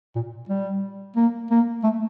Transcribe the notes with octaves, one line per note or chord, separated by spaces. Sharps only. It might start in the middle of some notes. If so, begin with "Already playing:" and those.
A#2
G3
A#3
A#3
A3